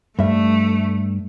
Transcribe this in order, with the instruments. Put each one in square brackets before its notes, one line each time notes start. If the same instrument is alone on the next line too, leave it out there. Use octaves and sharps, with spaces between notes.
[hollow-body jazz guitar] G2 E5 [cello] A3